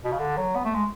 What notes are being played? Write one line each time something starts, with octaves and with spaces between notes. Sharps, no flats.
B2
C#3
D3
F#3
B3
A3
G#3